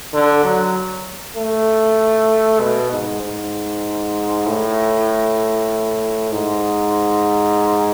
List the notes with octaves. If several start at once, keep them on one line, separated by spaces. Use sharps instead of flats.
D3
F#3
A3
B2
G#2
G#2
A2
G#2